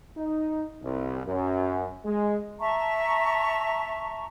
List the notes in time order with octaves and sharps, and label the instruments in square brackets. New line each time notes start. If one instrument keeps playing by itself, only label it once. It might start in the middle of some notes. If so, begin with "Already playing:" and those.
[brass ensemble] D#4
C2
F#2
G#3
[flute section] E5 A5 A#5 C#6